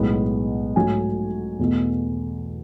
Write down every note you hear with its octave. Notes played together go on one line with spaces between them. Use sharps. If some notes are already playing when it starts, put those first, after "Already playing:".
Already playing: B1 A2 G#3 B3
G#2 F#3 A3 G#5
E2 B2 A3